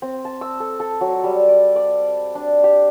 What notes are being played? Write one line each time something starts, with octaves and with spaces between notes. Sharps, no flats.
C4
A5
E6
A4
A4
F#3
G3
D5
D5
D4
G4